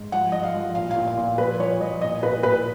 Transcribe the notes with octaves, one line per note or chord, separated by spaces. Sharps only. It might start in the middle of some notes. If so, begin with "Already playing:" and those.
Already playing: G#2
F3 F#5
F3 D#5
F5
F3
A#2 F5
F5
A#2
F5
A#2
F3 B4
F3 C#5
F3 D#5
A#2 D#5
A#2 B4
A#2 B4